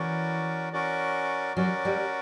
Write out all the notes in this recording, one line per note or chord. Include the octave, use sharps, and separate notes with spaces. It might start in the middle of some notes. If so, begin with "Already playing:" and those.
Already playing: E3 C#4 F#4 A#4 D5
C#4 F#4 A#4 D5
F#3 C#4 F#4 A#4 D5
G3